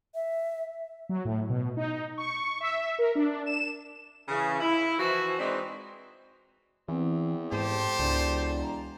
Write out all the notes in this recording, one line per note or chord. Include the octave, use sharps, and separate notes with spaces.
E5
F#3
A2
B2
D#4
C#6
E5
A#4
D4
E7
C#3 E3
E4
E3 F3 F#4
E3 G#3 C4 D4 D#4
E2 E3 C4
G#2 G4 A4 C5 A5
E1 C#2 D5
A#5